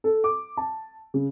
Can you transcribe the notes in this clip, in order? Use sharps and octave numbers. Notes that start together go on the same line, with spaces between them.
A4
D6
A5
C#3